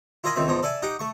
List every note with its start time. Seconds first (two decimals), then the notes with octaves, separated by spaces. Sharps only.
0.24 E4 F4 A#4 D#5 G#5 B5
0.35 C#2 D#3 C4 E5 B5
0.48 E2 G#2 F3 A#5
0.63 A4 D5 E5 G#5
0.82 D#4 G4 F#5 G5
0.99 A3 C#6